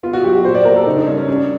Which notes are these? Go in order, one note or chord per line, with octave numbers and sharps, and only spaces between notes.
B3 F4
F#4
F#3 G4
G4
A#2 C5
D5
A3 A#4
A4
C#3 D#4
D4
G3 C#4
C#4
G3 D4